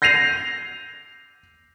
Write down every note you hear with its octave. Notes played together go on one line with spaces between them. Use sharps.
G6 A#6 C7 D#7 F7